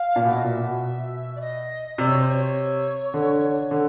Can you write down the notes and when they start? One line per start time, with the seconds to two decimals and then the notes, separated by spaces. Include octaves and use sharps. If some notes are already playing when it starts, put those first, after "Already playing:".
Already playing: F5
0.16 A#2
0.25 B2 E5
0.35 D#5
0.44 A#2 E5
0.63 B2
1.35 D5
1.41 D#5
1.98 C3 D5
2.08 C#5
2.18 C5
2.28 C#5
3.14 D3
3.71 D3